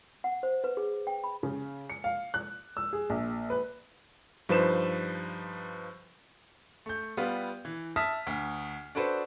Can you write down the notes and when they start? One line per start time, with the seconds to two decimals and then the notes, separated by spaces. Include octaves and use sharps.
0.24 F#5
0.43 C5
0.64 B4
0.77 G#4
1.07 G5
1.24 B5
1.43 C#3
1.90 C#7
2.04 F5
2.34 F#6
2.77 E6
2.93 G#4
3.10 A#1
3.50 B4
4.49 G2 F3 D#4 B4 C5 E7
6.86 A3 G6
7.17 G3 B3 F4 B4
7.65 E3
7.96 E5 A5 D#6 F6 B6
8.27 D2
8.95 D4 F#4 A4 B4 C5